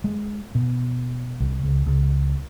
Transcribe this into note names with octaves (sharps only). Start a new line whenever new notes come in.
G#3
B2
C2
C#2
C#2